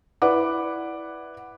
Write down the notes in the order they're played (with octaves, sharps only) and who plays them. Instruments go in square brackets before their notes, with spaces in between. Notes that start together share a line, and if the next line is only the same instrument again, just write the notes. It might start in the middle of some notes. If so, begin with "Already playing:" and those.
[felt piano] E4 B4 D5 F#5 D6